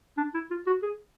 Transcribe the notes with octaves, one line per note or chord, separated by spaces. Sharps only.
D4
E4
F4
F#4
G#4